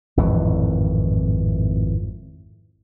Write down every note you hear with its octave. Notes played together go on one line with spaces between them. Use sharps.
G#1 F2 A2 E3